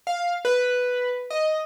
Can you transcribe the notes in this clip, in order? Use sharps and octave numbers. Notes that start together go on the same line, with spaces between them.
F5
B4
D#5